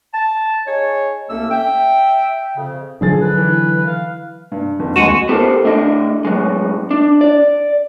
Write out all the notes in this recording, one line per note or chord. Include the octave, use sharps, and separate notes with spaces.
A5
D#4 G#4 C#5
C2 A3 A#3 C#4 E6
E5 G5
F2 C#3
D3 F3 F#3 D4 G#4 A6
B4
E3
F5
G2
G1 F2
D#2 G#3 F#4 C#7 D#7 E7
B3 G4 A4 A#4 C5
A2 D4 D#5
A2 F#3 G#3
D4
D5